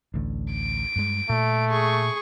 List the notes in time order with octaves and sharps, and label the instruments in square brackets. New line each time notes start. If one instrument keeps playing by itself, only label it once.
[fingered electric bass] A1 D2
[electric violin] D7
[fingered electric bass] G2 G#3
[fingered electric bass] A#2 [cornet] A3
[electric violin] G#4 C#6